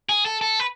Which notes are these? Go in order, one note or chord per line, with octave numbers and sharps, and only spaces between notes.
G#4
A4
A4
B4